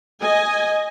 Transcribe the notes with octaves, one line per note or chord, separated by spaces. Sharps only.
D#5 G#5